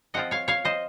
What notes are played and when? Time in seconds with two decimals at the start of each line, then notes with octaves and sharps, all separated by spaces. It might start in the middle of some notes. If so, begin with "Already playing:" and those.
0.14 F3 C4 F4 D#5 F#5
0.31 C#5 F5
0.48 C#5 F5
0.65 C5 D#5